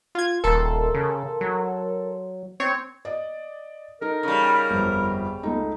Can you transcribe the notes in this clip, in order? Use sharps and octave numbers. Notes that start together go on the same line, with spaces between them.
F4 G#6
D#1 A4 A#4 C6
C#3
F#3
C4 C#5
D5 D#5
D#4 A4 A#4
C#3 G3
G1 F2
C#2 A3 D#4